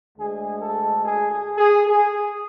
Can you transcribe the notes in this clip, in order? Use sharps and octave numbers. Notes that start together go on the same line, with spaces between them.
D2 D3 G#3 G#4
A4
G#4
G#4
G#4
G#4